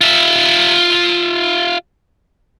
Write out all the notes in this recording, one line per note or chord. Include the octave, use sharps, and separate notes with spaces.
F4 E5